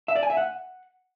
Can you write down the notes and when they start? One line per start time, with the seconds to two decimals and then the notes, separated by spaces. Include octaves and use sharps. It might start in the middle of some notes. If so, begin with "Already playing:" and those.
0.08 E5
0.16 D5
0.23 G#5
0.30 E5
0.37 F#5